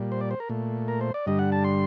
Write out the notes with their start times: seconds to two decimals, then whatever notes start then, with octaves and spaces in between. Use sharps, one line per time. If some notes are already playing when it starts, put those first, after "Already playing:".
Already playing: A#2 G3
0.12 C5
0.21 D5
0.31 C5
0.40 A#4
0.49 A#2 A3
0.88 A#4
1.01 C5
1.14 D5
1.26 G2 D3 G3 D#5
1.39 F#5
1.52 A5
1.64 C6